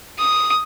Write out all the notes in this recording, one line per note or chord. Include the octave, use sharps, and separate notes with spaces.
D#6